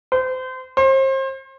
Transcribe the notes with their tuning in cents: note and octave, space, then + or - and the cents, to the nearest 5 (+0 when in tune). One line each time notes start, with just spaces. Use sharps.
C5 -30
C5 +35